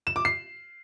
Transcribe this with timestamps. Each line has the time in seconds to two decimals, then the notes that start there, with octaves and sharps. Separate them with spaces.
0.07 E7
0.16 D6
0.25 C7